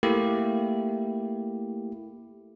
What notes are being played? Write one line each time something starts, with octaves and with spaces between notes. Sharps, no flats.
A3 A#3 E4 G4